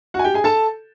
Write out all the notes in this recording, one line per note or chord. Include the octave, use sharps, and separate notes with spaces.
F#4 F#5
G#5
G4 G5
G#4 G#5
A4 A5